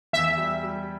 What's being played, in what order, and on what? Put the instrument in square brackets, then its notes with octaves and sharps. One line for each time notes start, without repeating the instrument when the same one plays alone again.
[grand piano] E2 [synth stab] E5
[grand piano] G3
G3